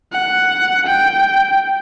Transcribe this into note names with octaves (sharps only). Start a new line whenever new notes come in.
F#5
G5